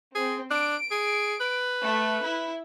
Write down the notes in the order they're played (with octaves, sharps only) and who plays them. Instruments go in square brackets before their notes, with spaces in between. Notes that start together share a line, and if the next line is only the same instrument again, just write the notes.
[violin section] C4 [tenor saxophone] G#4
[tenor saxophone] D4 [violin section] D7
[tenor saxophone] G#4
B4
[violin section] A3
E4